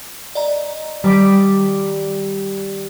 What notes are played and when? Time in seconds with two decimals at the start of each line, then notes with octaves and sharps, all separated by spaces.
0.35 D5 D#5 A#5
1.04 D#3 G3 D5 D6 B6